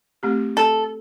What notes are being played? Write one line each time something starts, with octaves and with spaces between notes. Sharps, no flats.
A3 C4 G4
A4